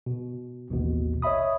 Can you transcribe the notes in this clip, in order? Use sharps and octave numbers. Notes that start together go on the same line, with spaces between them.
B2
A1 D#2 B2
C#5 D#5 E5 B5 D#6